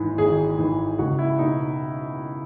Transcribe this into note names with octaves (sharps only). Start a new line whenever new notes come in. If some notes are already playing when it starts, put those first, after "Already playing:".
Already playing: G#1 G#2 E3
G#1 G#4
G#2 E3
C#2 F#4
E4
B2 D#4